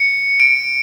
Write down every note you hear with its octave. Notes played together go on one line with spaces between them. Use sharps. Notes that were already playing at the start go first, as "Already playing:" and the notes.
Already playing: C#7
D7